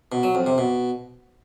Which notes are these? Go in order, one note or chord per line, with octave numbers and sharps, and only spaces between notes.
B2
F#3
F2
C3
B2